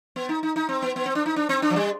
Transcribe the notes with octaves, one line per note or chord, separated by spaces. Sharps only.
B3
D#4
D#4
D#4
C4
B3
B3
C4
D4
D#4
D4
C4
D4
F3
G3